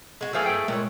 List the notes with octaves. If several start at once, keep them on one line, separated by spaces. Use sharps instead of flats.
G#3 F#4
E3 F#3 A3 G#4 C5 F5
A4 G5
A#2 G#3 C#5